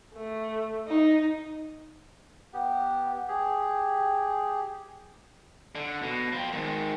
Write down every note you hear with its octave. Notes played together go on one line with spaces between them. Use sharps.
A3
D#4
B3 G4
G4 G#4
D3
B2
F3 C4
G#2 D#3